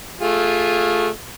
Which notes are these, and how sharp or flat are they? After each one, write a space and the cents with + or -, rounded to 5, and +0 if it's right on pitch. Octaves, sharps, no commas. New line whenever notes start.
A3 -10 F4 +15 G#4 -15